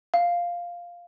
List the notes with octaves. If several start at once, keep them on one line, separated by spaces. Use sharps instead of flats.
F5